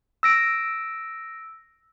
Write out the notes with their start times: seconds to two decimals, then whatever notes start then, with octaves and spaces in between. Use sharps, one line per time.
0.23 E6 A#6 D7